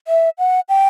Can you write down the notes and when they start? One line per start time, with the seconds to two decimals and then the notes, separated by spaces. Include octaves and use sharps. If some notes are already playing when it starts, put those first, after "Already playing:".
0.08 E5
0.38 F#5
0.69 G5